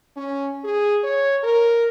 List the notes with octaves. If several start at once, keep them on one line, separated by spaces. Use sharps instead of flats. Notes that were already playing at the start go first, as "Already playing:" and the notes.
C#4
G#4
C#5
A#4